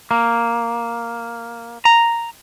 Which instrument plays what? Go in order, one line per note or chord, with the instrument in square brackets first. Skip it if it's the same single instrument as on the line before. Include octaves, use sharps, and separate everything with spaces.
[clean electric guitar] A#3
A#5